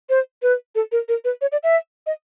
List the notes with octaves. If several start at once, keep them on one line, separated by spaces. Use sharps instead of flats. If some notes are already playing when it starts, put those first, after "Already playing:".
C5
B4
A4
A#4
A#4
B4
C#5
D5
E5
D#5